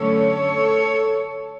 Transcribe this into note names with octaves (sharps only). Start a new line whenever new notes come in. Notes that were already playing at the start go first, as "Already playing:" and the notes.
Already playing: F#2 D3 A3 C#4 A4 C#5